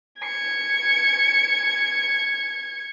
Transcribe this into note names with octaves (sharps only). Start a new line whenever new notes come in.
G#6 C#7